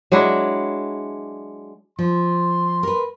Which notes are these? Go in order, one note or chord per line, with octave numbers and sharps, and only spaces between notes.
F#3 G#3 D4 E4
F3 C6
A#4 B4